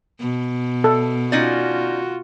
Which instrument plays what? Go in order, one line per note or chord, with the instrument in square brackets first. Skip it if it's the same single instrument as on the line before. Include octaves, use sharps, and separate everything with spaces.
[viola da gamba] B2
[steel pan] A4
[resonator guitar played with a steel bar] C#4 D#4 D5 [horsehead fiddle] F4 F#4